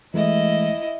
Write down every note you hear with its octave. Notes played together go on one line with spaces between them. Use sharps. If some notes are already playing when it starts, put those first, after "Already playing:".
E3 G#3 A3 E4 D#5